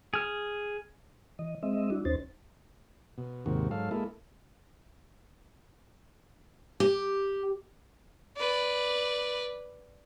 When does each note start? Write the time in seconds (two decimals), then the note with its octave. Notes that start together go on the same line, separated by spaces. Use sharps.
0.14 G#4 F6
1.39 E3 D#5
1.63 G#3 C4 D#5 E5
1.90 G3 D4 E4 F#4
2.05 D#2 C#4 D#4 C5 A6
3.18 B2
3.46 D#2 G#2 C3 D#3 F#4
3.71 G#2 F#3 A4 F5
3.91 G#3 A#3 E4 A4
6.80 G4
8.37 B4 D5